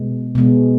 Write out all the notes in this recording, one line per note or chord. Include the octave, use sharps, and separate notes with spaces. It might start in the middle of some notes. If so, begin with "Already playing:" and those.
Already playing: B2 G#3 B3
B2 G#3 B3